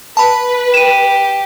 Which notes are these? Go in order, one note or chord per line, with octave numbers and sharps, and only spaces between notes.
B4 A5 B5
G4 D#7 E7